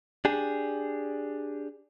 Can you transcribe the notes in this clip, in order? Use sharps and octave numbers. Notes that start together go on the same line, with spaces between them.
D4 G4 G#4